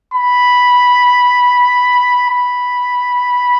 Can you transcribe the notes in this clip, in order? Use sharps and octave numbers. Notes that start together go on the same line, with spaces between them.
B5
B5